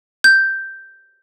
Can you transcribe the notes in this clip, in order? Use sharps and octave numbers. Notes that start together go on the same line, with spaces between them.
G6